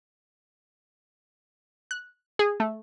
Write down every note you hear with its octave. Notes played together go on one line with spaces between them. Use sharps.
F#6
G#4
A3